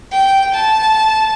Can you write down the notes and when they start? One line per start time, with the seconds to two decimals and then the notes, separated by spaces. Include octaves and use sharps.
0.13 G5
0.55 A5